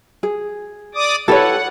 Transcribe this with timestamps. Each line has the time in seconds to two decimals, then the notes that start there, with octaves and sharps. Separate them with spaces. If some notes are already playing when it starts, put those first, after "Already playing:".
0.23 G#4
0.95 D5 D6 D#6
1.28 E4 G4 A4 B4 C#5 F#5